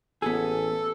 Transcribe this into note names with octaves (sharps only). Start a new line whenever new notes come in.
A1 B3 G#4 A4